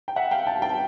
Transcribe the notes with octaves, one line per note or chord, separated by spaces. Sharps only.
G5
E5 F#5
F5 G5
G5 A5
G5 A5